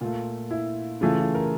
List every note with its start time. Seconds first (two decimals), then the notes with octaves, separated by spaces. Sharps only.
0.01 A#2 A3 F4
0.51 E4
1.01 C#3 E3 A3 F4
1.19 F4
1.35 A#4